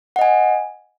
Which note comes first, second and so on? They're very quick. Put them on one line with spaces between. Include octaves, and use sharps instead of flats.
F#5 D#5 G#5